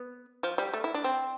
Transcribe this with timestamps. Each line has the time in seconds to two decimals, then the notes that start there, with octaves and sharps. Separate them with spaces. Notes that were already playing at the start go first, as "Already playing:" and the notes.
Already playing: B3
0.43 F3
0.58 G3
0.74 A3
0.84 E4
0.94 D4
1.04 C4